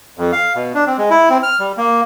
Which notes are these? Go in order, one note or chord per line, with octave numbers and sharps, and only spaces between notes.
F2
F5
B2
D4
C4
G#3
E4
C4
F6
G3
A#3